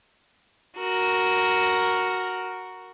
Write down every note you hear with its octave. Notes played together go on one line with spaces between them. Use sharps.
F#4 A#4